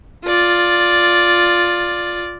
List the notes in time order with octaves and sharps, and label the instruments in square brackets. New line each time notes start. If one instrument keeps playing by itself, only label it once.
[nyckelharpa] F4 D5